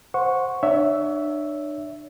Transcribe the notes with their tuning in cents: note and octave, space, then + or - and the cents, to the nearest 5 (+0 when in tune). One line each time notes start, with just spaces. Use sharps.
C5 +0 F#5 -20 C#6 +0
D4 +35 C#5 +30 E5 +0